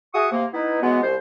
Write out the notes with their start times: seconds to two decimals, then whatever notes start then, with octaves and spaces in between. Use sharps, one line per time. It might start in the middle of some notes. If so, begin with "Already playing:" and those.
0.14 F#4 G#4 E5 C#6 D#6
0.32 C3 A#3
0.53 B3 D#4 E4
0.81 E3 F#3 G#3 B3
1.02 C2 C5